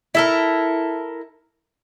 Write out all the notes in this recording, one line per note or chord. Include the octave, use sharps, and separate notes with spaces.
E4 A4 A#4